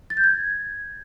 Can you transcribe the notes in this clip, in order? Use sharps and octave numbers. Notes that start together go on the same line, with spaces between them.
A6
G6
G#6